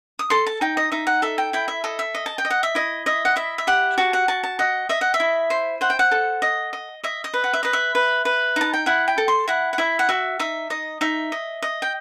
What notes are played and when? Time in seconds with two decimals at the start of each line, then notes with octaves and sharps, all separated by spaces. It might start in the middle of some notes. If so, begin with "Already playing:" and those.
0.19 D#6
0.30 A4 C6
0.47 A5
0.61 D#4 G5
0.77 D#5
0.92 D#4 E5
1.07 F#5
1.22 A4 E5
1.38 G5
1.53 E4 G5
1.68 E5
1.84 A4 D#5
1.99 E5
2.15 D#5
2.26 A5
2.38 G5
2.45 D#5
2.50 F#5
2.63 E5
2.75 E4 D#5
3.06 D#5 E5
3.25 F#5
3.36 E4 E5
3.58 E5
3.67 G4 F#5
3.98 F#4 A5
4.13 F#5
4.28 F#4 A5
4.44 A5
4.59 D#5 F#5
4.89 D#5 E5
5.01 F#5
5.14 E5
5.20 E4
5.50 C5
5.81 C5 F#5
5.90 G5
5.99 F#5
6.11 A4
6.42 D#5
6.73 D#5
7.04 D#5 E5
7.24 D#5
7.34 B4
7.44 F#5
7.54 E5
7.63 B4 D#5
7.73 E5
7.95 B4
8.25 B4
8.56 D#4 A5
8.73 G5
8.86 E4 F#5
9.08 G5
9.18 A4
9.28 C6
9.48 E4 F#5
9.73 F#5
9.78 E4 E5
9.99 F#5
10.09 F#4 E5
10.39 D#4 E5
10.70 D#4 D#5
11.01 D#4 E5
11.32 D#5
11.62 D#5
11.82 G5